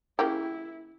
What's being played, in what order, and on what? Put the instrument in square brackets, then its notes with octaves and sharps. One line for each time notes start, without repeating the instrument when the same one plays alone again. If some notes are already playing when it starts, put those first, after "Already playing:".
[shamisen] C#3 A#3 G4 [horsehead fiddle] E4